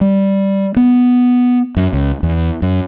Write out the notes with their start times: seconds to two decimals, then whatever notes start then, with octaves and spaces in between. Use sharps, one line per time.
0.01 G3
0.76 B3
1.77 F#2
1.93 C#2
2.23 E2
2.62 F#2